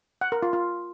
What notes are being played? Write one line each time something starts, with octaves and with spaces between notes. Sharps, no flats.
F#5
A#4
F4
F4